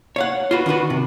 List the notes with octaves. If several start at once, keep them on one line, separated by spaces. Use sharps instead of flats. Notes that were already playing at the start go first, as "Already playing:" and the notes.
C#5 F5 F#5
F4 F#4 B4
D#3 D4 F#4 B4
C3